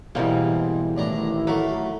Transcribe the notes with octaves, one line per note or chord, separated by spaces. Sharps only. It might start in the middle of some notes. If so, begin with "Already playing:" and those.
E2 G#2 B2 E3 G3 A#3 C4
A1 A2 D#3 D4 E4 A#5
F#3 A3 F5 F#5 B5